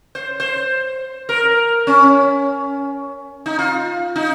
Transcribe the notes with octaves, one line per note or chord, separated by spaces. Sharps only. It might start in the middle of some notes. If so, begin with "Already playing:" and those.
C5
C5
A#4
C#4
D#4
F4
D#4